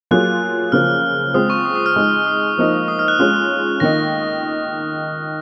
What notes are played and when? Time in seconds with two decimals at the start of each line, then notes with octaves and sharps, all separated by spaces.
0.11 F#3 A#3 F4 G#4 F#6
0.72 C#3 F3 A#3 F6
1.34 G#3 C4 F4 D#6
1.50 C#6
1.65 D#6
1.75 D#6
1.86 F6
1.96 G#3 D#4 G#4
2.26 D#6
2.58 F3 A#3 D#4
2.88 D#6
2.99 F6
3.08 F#6
3.19 G#3 C#4 F4
3.80 D#3 A#3 D#4 A#6